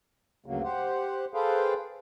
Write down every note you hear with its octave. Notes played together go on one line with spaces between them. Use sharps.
D2 G2 C#3 F#3 A#3
G4 C5 F#5
G#4 A4 B4 C5 F5 G5